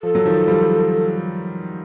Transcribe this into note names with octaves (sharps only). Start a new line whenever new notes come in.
F3 A4
F#3
D#3 F3
F3 G3